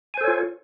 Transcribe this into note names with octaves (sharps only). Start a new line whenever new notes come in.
F4 A4 C5 C#5 G#5